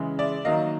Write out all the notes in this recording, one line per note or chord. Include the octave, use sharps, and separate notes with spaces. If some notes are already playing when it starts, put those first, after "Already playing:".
Already playing: C#3 E3 G#3
D5 E5
D#3 F#3 A#3 D#5 F5